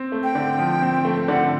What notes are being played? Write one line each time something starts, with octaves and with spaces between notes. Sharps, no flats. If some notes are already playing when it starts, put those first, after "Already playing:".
Already playing: C4
A3
G5
D3
F3
C4
A3
D3 F#5